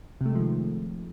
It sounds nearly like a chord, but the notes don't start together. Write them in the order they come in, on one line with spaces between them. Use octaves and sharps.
C3 A3 G#3 F3 D#3